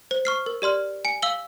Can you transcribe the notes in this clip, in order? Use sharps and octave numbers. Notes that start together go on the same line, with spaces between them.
C5
C#6 F6 C7
A#4
G4 D5 C6 F6
G#5 C#7
F5 E6 F#7 G7